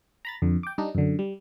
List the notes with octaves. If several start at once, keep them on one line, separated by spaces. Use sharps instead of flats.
A#5 B5 A6
F2 D3
G5 D6
G3 D4 D#4
F#2 D3
G3